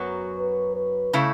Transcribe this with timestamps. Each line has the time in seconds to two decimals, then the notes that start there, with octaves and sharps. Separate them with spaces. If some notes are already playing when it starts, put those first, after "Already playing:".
Already playing: F#2 F#3 B3 F#4
0.39 B4
0.76 B4
1.13 C#3 A3 E4